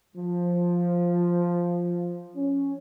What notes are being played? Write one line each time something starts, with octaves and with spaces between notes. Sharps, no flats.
F3
C#4